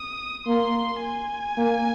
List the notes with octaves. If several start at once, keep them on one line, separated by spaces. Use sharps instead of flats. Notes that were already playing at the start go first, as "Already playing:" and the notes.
Already playing: D#6
A#3 C6
G#5
A#3